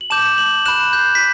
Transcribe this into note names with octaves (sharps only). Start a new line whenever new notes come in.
F#7
A5 D6 G6 E7
F#7
B5 F#6 E7
G6
B6